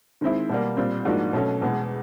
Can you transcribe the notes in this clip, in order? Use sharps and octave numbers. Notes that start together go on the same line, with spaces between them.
D#3 G#3 C4 E4
B2 G3 A#3
A#2 G3 C4
G#2 F3 A#3 D4 F#4
B2 F#3 A3 C#4
E2 B2 G#3